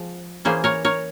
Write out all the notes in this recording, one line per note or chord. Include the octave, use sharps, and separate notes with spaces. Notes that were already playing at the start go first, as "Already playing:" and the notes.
Already playing: F3 G#3 C4
E3 A#3 C#4 G#4 C5
A#4 C#5
A#4 C#5